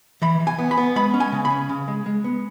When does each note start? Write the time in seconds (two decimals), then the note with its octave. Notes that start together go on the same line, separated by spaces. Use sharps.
0.22 E3 B5
0.40 E3
0.47 G#5
0.58 B3
0.71 B5
0.78 B3
0.96 G#3 B5
1.14 C#4
1.20 G#5
1.32 C#3
1.45 B5
1.50 C#4
1.69 C#3
1.88 G#3
2.06 G#3
2.24 B3